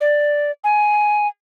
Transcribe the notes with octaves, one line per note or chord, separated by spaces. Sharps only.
D5
G#5